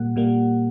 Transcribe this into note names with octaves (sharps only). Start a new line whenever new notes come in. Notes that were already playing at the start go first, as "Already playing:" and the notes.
Already playing: A#2 G3 A#3 F#5
A#2 G3 A#3